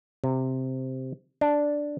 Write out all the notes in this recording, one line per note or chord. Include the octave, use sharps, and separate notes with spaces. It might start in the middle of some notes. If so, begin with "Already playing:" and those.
C3
D4